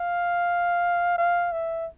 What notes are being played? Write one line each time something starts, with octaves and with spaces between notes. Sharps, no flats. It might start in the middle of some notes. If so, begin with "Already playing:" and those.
Already playing: F5
F5
E5